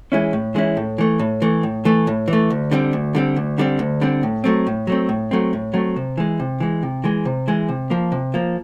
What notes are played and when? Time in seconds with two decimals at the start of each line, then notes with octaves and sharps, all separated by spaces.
0.12 E3 G#3 C#4 E4
0.33 A2
0.55 E3 G#3 C#4 E4
0.77 A2
0.98 E3 A3
1.20 A2
1.42 E3 A3
1.63 A2
1.85 E3 A3
2.07 A2
2.28 E3
2.33 A3
2.50 D2
2.71 D3 G3 C4
2.93 D2
3.15 D3 G3 C4
3.36 D2
3.58 D3 G3 C4
3.79 D2
4.01 D3 G3 C4
4.23 A2
4.44 F#3 A3 C4
4.67 A2
4.87 F#3 A3 C4
5.09 A2
5.31 F#3 A3 C4
5.53 A2
5.74 F#3 A3 C4
5.96 C3
6.18 E3 G#3
6.40 C3
6.60 E3 G#3
6.83 C3
7.04 E3 G#3
7.25 C3
7.48 E3 G#3
7.69 C3
7.90 F3 A#3
8.12 C3
8.34 F3 A#3